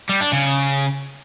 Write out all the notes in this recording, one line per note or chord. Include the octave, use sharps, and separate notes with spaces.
G3
D4
C#3